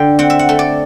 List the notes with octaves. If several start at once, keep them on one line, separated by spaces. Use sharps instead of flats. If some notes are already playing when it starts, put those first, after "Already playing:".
Already playing: D3 G5
C4 F#5
E5
F#5
A3
D5